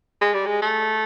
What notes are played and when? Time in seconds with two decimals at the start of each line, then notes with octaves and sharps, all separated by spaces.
0.21 G#3
0.34 G3
0.46 G#3
0.62 A3